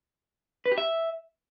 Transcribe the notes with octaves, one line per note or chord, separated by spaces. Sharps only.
B4
G4
E5